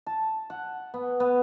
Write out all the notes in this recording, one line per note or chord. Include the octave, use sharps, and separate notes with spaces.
A5
F#5
B3
B3